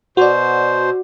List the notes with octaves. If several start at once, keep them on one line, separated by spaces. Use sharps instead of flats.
B2 F#4 C5 D5